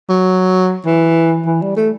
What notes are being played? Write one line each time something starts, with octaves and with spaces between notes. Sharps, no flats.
F#3
E3
E3
G3
A3